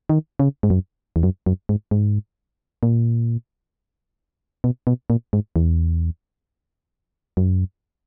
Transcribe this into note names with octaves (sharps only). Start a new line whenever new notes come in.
D#3
C#3
G#2
F#2
E2
F#2
F#2
G#2
G#2
A#2
B2
B2
A#2
G#2
E2
F#2